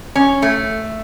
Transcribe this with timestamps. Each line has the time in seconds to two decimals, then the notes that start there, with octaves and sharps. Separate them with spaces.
0.15 C#4
0.42 A3